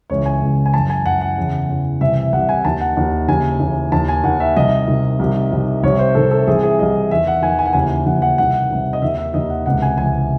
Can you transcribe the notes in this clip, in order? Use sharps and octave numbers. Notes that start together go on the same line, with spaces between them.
C#2 C#3 E3 C#5
G#5
C#2 C#3 E3
G#5
F#2 E3 A5
G#5
F#2 E3 F#5
F#5
E2 C#3 E3
E2 C#3 E3
C2 C3 E3 E5
C2 C3 E3 F#5
G#5
D#2 D#3 A5
F#5
D#2 D#3
D#2 C#3 E3 G#5
D#2 C#3 E3
D#2 D#3 A5
G#5
D#2 D#3 F#5
E5
C2 C3 D#3 D#5
C2 C3 D#3
C2 C3 D#3
C2 C3 D#3
C2 C3 D#3 C#5
C5
C2 C3 D#3 A4
A4
C2 C3 E3 G#4
G#4
C2 C3 E3 D#5
E2 D#3 E5
F#5
E2 D#3 G#5
G#5
F#5
D#2 C#3 E3 G#5
D#2 C#3 E3 F#5
F#5
C2 C3 D#3 F#5
C2 C3 D#3
D#5
D#2 D#3 E5
E5
D#2 D#3 D#5
F#5
C#2 C3 E3 F#5
G#5
C#2 C3 E3 G#5